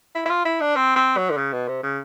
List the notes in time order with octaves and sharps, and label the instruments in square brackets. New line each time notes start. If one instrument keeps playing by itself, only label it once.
[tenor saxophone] E4
E4
F4
E4
D4
C4
C4
F#3
D3
C#3
B2
C3
C#3